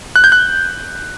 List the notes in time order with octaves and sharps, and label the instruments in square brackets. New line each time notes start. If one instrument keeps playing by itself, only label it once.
[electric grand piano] F#6
G6
F#6